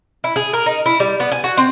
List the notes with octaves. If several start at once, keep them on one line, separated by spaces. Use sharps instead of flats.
E4
G#4
A#4
D#4
E4
G3
B3
G#5
F#4
C4